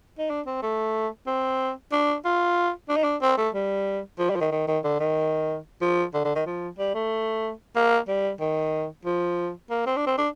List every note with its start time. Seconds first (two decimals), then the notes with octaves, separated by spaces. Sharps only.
0.18 D#4
0.30 D4
0.46 C4
0.62 A3
1.27 C4
1.92 D4
2.25 F4
2.89 D4
2.96 D#4
3.04 D4
3.22 C4
3.38 A3
3.54 G3
4.19 F3
4.30 G3
4.36 F3
4.41 D#3
4.51 D#3
4.67 D#3
4.84 D3
5.00 D#3
5.81 F3
6.14 D3
6.24 D3
6.35 D#3
6.46 F3
6.78 G3
6.94 A3
7.75 A#3
8.08 G3
8.40 D#3
9.05 F3
9.70 A#3
9.86 C4
9.97 D4
10.07 C4
10.18 D4